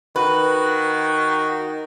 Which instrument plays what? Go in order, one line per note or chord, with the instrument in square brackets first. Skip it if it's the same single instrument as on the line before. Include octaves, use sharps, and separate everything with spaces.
[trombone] D#3 [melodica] F#4 [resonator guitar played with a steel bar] B4